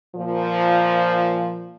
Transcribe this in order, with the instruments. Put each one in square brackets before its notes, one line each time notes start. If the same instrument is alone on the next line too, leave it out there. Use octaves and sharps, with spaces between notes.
[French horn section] A#2 F3